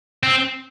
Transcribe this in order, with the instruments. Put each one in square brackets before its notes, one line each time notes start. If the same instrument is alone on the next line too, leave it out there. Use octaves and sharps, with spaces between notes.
[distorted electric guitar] C4